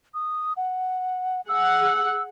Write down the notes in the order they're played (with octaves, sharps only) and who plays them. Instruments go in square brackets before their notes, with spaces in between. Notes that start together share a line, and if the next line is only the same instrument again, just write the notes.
[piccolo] D#6
F#5
[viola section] G#4 F#5 [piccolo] E6